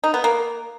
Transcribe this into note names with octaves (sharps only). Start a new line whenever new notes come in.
D#4
B3
A#3